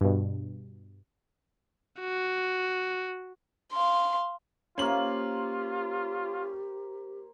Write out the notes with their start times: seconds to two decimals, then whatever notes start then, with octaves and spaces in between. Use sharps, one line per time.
0.01 G2 B2
2.00 F#4
3.72 F5 C6
4.78 A#3 C#4 F4 G4 C5 F#7